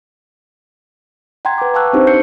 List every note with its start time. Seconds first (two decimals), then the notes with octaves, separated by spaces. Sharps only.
1.45 F#5 G5 A#5 C6 G#6
1.58 B4 D6
1.74 F5 G5 A5 C#6 E6 F#6
1.93 C4 D4 D#4 G4 C5
2.07 G6 C7 C#7